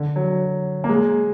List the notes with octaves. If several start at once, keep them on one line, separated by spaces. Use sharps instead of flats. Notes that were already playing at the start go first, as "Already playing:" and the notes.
Already playing: D3
F#3
A#3
G#3